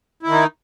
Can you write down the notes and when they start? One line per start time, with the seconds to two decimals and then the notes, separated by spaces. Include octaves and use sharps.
0.23 E4
0.27 D#3
0.32 D#4